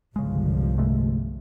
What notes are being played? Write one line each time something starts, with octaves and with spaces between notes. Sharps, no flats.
G1 C2 C#3 F3 G#3
C3 G#3 A3